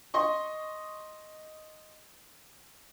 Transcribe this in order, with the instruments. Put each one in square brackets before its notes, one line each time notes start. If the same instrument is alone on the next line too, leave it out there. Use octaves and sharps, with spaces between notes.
[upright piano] D#5 C6 C#6